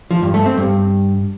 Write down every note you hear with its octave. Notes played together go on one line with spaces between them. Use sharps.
F3
G2
A3
C4
G2